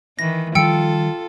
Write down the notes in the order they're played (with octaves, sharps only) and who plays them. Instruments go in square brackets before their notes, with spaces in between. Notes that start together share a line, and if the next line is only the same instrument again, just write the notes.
[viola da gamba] D#3 E3 [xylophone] A#6
[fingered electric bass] D#3 F3 G3 [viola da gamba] F4 A4 [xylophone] G5 E6 C#7